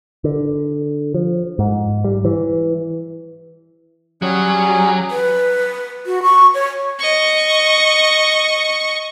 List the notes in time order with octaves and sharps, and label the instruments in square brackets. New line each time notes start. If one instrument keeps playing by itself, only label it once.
[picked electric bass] D3
F3
G#2
G3
E3
[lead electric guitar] F#3 [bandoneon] G3 C#4 G#4
[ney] B4
F#4
C#6
C#5
[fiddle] D#5 C#6